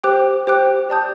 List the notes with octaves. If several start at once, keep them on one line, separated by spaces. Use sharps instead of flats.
G4 C5 G5 D6 F#6
G4 C5 G5 D6 F#6
G4 D5 A5 D#6 G6